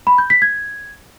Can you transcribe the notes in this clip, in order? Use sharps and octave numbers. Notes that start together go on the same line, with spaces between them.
B5
G6
B6
G#6